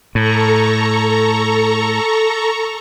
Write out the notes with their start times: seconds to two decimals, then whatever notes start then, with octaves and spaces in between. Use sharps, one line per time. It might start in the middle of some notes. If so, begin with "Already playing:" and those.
0.15 A2 A4 A#5 C#6